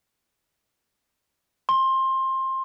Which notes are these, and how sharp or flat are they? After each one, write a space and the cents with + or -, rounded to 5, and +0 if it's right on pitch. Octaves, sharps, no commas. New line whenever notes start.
C6 +20